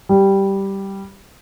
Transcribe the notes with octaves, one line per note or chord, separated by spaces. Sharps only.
G3